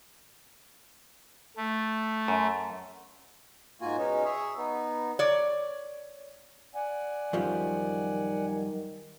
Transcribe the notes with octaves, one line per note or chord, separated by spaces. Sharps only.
A3
F#2
G#2 A#3 F4 F#4 G#5
B2 G#3 C#4 D#4
G#4 C#5 E5
B3 D#4
C#5 D5
D5 F#5 G#5
F#2 D#3 F3 G3